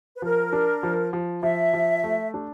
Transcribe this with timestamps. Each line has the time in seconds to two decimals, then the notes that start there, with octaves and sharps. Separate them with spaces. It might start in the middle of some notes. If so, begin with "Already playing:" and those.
0.16 B4
0.22 F3 A#4
0.53 D4
0.83 F3
1.13 F3
1.43 F3 E5
1.73 F3
2.04 A3
2.34 D4